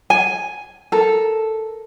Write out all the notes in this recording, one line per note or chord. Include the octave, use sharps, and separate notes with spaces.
G#5
A4 A#4